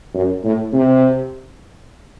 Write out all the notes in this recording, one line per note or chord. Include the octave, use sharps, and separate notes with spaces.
F#2
A2
C3